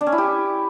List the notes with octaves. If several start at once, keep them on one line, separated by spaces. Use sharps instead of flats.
D4
C#4
E4
G4